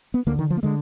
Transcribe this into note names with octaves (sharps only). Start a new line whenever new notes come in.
B3
D2 D3 A#3
D#3
F3
A#3
D3 G#3